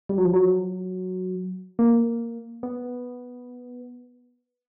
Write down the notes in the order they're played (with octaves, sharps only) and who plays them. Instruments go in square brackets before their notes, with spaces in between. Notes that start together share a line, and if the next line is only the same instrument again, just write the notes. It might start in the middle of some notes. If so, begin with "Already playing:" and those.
[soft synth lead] G3
F#3
F3
F#3
A#3
B3